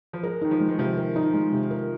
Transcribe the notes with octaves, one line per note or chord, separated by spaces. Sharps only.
F3
G#3 A#4
D#3 D#4
F3
G#3
D#3
C3 F3
A#4
D#4
G#3
C3
A#4